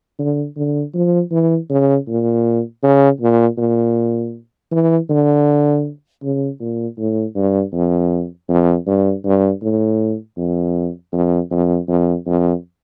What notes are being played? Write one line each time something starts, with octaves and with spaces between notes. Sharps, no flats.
D3
D3
F3
E3
C#3
A#2
C#3
A#2
A#2
E3
D3
C#3
A#2
A2
G2
F2
F2
G2
G2
A2
F2
F2
F2
F2
F2